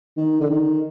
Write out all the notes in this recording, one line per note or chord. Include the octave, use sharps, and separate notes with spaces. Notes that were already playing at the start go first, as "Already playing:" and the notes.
D#3
D3
D#3